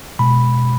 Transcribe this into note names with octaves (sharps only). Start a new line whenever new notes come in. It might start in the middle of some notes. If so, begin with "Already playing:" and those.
B2 G#3 B5